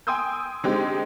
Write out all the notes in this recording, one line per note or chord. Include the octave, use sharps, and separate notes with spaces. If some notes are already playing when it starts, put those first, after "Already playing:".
G5 G#5 C6 D#6 E6 G6
D3 G#3 C4 D#4 G4